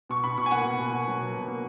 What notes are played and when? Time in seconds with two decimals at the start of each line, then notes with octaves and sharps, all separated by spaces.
0.09 B2 C#6
0.24 B2 B5
0.38 B2 C#6
0.46 G#5
0.51 A#3 F#5
0.65 B2
0.79 B2
0.93 B2
1.07 F#3
1.20 B2
1.35 B2
1.48 A#3